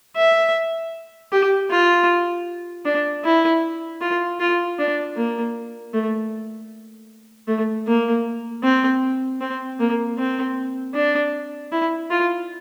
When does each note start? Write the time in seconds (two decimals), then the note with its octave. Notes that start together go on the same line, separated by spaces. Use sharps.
0.16 E5
1.32 G4
1.71 F4
2.85 D4
3.24 E4
4.01 F4
4.40 F4
4.79 D4
5.17 A#3
5.94 A3
7.48 A3
7.87 A#3
8.63 C4
9.41 C4
9.80 A#3
10.18 C4
10.94 D4
11.72 E4
12.11 F4